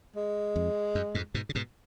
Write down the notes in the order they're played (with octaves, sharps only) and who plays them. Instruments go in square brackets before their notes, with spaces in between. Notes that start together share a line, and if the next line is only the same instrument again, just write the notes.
[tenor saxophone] G#3
[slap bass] F2
F#2
F2 G#2
G#2 B2
C#3
G#2 B2